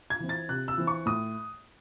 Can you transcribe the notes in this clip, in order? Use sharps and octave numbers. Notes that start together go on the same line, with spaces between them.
G#6
E3 C4
A6
C3 F#6
E6
E3 C4
C#6
A2 D#6